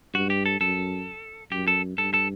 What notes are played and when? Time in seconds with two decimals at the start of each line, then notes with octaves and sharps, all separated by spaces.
0.14 G2 F#4
0.30 G4
0.46 A4
0.61 F#2 A4
1.52 F#2 G4
1.67 A4
1.98 G2 A4
2.14 A4